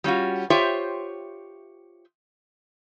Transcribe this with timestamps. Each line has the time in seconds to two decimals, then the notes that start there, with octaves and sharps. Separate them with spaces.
0.04 G3 C#4 F4 F#4
0.50 F4 G4 C5 C#5 E5 G5